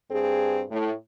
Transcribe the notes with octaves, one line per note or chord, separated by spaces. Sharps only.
G2 C4 G#4
A2